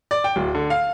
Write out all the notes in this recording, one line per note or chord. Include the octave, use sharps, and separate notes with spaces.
D5
G5
D1
D3
F5